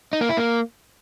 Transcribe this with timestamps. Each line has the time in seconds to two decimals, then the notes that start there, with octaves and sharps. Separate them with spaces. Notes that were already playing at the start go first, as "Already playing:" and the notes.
0.13 D#4
0.21 A#3
0.29 E4
0.37 A#3